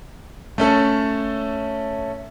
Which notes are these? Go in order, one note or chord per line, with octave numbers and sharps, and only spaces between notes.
A3 C#4 A4